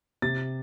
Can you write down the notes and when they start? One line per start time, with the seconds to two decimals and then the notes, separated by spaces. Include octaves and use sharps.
0.22 C3 A6